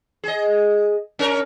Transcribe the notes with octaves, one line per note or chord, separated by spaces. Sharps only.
G#4 D#5
C#4 A#4